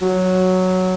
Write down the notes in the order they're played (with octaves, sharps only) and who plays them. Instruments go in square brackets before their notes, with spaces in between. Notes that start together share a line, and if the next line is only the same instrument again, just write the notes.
[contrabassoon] F#3